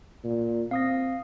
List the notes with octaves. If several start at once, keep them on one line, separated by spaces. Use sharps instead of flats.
A#2
C4 F5 D#6 A#6